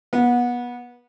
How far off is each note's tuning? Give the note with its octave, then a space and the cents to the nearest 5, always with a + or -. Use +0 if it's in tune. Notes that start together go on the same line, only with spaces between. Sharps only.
B3 -25